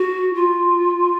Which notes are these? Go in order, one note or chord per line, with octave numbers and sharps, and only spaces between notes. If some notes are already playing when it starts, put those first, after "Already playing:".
Already playing: F#4
F4